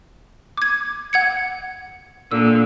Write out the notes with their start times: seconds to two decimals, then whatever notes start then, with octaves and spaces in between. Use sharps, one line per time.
0.57 D6 G#6
1.13 F#5 G#6 C#7
2.31 A#2 D3 E6